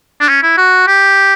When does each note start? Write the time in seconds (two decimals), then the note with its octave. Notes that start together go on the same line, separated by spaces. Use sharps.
0.20 D4
0.29 C#4
0.43 E4
0.57 F#4
0.87 G4